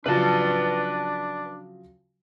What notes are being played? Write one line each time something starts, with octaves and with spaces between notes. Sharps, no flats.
C#3 F3 F#3 D4 B4 A5